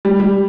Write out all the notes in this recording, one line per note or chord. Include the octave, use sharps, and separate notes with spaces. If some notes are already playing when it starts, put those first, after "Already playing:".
G3
G3